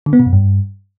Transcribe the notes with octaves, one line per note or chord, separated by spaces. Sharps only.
D3
B3
B2
F#2
G2